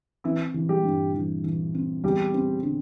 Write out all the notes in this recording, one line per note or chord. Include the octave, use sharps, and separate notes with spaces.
E3 C4 E4
E3
G3 G4
G2
E3
E3
C4
E2 G3 G4
C4
D3